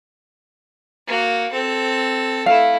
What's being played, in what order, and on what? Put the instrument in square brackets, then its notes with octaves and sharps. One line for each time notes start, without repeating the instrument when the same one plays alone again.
[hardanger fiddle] A#3 F#4
C4 A4
[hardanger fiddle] A3 E4 [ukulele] F5